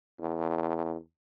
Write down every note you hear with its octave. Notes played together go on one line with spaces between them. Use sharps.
E2